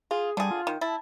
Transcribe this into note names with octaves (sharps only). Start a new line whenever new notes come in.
F4 G#4
D3 G3 G#4
F4
D#3
E4 A5